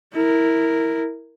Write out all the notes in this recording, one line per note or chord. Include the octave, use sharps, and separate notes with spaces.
E4 A#4